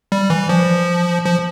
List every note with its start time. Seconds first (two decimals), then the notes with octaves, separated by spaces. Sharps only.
0.12 G3
0.30 E3
0.49 F3
1.26 F3